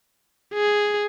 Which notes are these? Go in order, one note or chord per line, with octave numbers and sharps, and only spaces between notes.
G#4